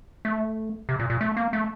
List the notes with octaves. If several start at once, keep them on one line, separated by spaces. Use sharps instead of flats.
A3
C3
A#2
A#2
A3
A#3
A3